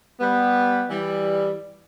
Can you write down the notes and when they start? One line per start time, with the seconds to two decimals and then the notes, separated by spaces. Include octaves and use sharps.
0.20 G3 B3
0.89 E3 G3